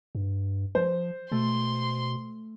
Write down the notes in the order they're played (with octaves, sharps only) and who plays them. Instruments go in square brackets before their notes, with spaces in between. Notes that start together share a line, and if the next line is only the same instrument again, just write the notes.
[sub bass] G2
[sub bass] F3 [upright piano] C5
[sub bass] B2 [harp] A3 [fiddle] C6